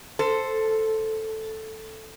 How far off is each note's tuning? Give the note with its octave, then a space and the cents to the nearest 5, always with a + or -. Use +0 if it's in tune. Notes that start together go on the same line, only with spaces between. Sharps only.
A4 +0 C5 +0